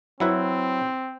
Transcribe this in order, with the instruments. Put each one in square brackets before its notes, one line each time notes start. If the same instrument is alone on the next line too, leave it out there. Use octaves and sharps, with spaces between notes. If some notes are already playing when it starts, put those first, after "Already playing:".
[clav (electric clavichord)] F#3 E4 B4 [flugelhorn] C4